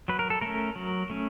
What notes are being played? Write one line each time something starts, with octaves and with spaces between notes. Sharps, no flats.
F#3 B4
A#4
A4
A3 C#4 A#4
F#3
A3 C#4